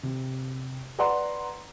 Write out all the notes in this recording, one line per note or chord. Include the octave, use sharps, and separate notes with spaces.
C3
B4 D5 F#5 A#5 C6